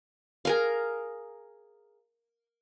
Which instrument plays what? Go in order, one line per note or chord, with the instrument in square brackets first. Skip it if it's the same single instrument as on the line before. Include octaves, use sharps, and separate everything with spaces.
[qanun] G#4 A#4 F5